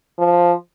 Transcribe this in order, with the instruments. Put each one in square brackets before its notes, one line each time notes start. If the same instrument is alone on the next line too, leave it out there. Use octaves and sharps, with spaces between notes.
[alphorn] F3